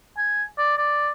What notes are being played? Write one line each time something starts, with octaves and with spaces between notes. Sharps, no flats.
G#5
D5
D5